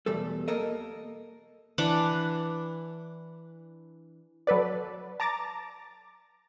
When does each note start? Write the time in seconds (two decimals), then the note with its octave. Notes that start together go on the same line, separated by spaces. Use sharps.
0.06 B1 E2 G3 A3 A4
0.48 A#3 A4 A#4 D#5
1.78 E3 D4 F#5 D6
4.47 F#3 A4 B4 D5
5.20 A5 A#5 D6 A6 A#6